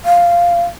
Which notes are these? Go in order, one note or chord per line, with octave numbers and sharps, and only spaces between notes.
F5